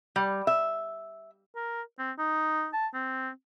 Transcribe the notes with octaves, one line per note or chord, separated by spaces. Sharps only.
G3
E5
A#4
C4
D#4
A5
C4